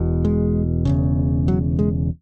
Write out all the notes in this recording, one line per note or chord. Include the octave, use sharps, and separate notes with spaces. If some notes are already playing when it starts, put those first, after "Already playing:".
Already playing: E1 E2 B2
G#3
E1 E2 C#3
F#3
G#3